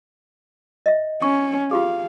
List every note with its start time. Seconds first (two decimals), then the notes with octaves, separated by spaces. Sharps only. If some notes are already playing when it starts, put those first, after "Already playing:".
0.86 D#5 E5
1.22 C#4 C#6
1.71 F4 G4 G#4 F5